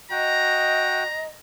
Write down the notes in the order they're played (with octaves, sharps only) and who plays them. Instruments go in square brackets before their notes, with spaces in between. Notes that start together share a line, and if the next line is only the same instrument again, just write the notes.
[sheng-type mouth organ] F#4 G5 [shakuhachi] D#5 [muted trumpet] A#5